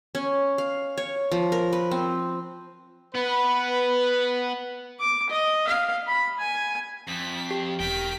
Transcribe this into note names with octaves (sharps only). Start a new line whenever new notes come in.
C#4
F5
C#5
F3
A#4
B4
C4
B3 B4
D6
D#5
F5
B5
G#5
F2 B6
G4
E1 A#4 G5 B6 D7